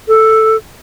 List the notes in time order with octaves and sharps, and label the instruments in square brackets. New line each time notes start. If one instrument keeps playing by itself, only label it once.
[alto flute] A4